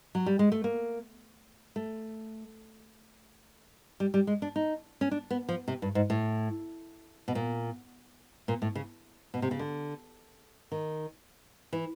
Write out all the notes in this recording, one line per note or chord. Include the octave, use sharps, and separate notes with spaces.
F#3
G3
G#3
A3
A#3
A3
G3
G3
G#3
D4
D#4
C#4
D4
B3
F3
C3
G2
G#2
A2
B2
A#2
A#2
A2
C#3
B2
C3
C#3
D3
D#3
E3